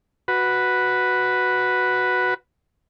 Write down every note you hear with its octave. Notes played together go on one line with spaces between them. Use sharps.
F#4 B4